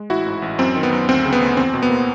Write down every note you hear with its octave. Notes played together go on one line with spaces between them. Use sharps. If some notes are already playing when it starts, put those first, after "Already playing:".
Already playing: G#3
A1 E4 F#4
G#2
A1
F#2 C4
D#3
B3
F#2
D2 C4
C#3
B3
D2
E2 C4
B2
B3
A#3